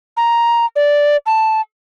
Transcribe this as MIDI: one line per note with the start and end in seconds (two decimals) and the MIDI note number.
0.17 0.65 82
0.76 1.17 74
1.26 1.61 81